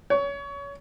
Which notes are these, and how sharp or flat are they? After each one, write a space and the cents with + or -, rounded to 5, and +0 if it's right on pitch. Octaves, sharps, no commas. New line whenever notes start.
C#5 +25